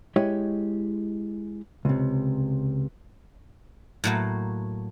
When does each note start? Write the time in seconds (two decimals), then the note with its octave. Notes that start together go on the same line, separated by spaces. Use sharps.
0.16 G#3 E4 G4 C#5 D#5
1.85 C#2 C3
4.04 A2 F#3 A#3